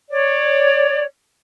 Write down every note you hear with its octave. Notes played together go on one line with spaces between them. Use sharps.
C#5 D5